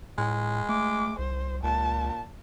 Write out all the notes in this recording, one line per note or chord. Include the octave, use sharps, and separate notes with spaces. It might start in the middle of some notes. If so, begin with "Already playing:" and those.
A2 G#3
A3 D6
C2 C5
C#2 A#2 A5